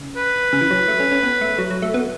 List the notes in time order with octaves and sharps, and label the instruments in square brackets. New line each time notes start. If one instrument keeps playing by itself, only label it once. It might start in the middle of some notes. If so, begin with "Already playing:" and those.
Already playing: [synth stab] C#3
[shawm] B4
[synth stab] C#3
E3
F#3
A3
C#4
C#4
B3
A3
F#3
F#3
A3
B3